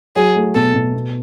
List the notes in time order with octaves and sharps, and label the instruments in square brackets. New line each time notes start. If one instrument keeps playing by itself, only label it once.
[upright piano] F#3 [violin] G#4
[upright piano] A3
[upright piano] B2 [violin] A4
[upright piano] B2
B3